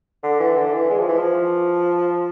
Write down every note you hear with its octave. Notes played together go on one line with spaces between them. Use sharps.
D3
E3
D3
E3
G#3
F3
E3
F3